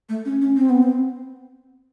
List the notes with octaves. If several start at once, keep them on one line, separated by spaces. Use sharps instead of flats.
A3
C#4
C#4
C4
B3
C4